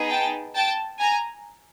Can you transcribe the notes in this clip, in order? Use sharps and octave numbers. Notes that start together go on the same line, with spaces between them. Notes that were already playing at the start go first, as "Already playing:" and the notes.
Already playing: B3 D#4 G#4
G5 A5
G5 A5
G#5 A#5